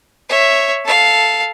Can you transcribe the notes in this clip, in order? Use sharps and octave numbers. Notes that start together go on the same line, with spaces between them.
C#5 E5
A4 F5